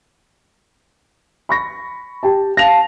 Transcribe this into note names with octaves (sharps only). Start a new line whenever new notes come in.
B5 C#6 A#6
G4 G5 A5
F5 A5 A#6 F7